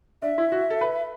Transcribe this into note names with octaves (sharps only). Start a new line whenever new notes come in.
D4 E5
E4
F#4
A4
B4